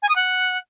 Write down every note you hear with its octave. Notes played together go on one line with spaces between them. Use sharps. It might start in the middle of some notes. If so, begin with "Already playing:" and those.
G#5
D#6
F#5